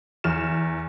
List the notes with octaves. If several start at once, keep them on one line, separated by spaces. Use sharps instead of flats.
E2 F6 E7